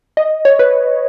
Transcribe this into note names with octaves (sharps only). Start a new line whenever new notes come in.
D#5
C#5
B4